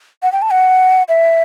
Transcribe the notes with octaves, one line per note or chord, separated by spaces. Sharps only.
F#5
G5
A5
F#5
E5